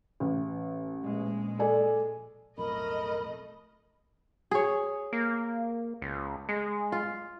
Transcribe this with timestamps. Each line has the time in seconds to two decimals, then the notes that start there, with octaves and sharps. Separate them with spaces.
0.20 A1
1.00 A#1 G#3
1.59 A4 D5 G#5
2.58 B1 F2 A2 A3 A#4 D#5 B5
4.51 G#4 C#5
5.13 A#3
6.02 C#2
6.49 G#3
6.92 F4